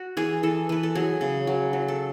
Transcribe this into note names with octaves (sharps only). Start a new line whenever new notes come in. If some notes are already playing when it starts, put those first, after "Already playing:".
Already playing: F#4
E3 G#4
E3 A4
E3 B4
A4
F#3 G#4
C#3
F#3
F#3
A4